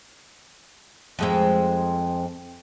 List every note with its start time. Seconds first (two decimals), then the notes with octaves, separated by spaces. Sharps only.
1.19 F2 G#3 C4